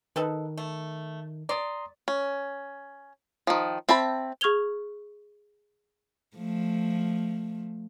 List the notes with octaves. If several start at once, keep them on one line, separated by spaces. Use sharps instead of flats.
D#3 D#4 A4 B4
A3
D5 A#5 C6 D#6
C#4
D#3 F3
C4 E5 A5 B5
G#4 C#6 F6 G#6 F7 G7
F3 A3